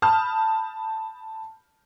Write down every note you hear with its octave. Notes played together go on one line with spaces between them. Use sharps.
A5 B5 D#6 F6 G6